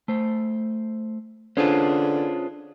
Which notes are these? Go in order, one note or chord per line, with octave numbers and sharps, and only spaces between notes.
A3 C5
D3 C#4 D4 F4 G#4 B4 C5